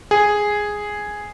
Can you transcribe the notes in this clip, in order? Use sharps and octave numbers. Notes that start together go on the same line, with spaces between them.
G#4